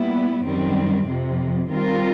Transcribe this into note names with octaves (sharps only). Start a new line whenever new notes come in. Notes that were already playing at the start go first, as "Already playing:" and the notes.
Already playing: A#2 G3 B3 E4
F#2 D#3 G3 C4
F2 C3 F3
D#3 G3 C4 F4 A#4